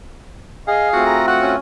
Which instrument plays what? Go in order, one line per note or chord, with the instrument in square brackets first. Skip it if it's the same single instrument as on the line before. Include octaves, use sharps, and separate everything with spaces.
[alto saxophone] G#4 [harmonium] D#5 [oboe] F5
[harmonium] A3 C4 F4 [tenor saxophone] F#4
[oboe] A#5
[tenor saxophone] F#4 [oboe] F#5
[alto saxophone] C#4